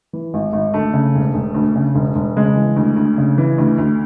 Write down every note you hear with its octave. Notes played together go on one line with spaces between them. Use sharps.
E3
G#1
G#1
D2 A3
C#3
E1
E1
D2
C#3
E1
E1
C#3 G#3
E3
D2
D2
C#3
E3
D2
D2